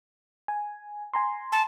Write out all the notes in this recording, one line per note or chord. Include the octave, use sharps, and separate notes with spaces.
G#5
G#5 A#5 C6
A5